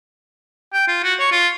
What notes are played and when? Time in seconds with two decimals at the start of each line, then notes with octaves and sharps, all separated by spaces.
0.73 G5
0.88 F4
1.04 F#4
1.19 C#5
1.32 F4